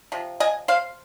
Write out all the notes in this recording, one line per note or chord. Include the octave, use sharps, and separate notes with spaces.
C3 F3
D#5 G#5
C5 F5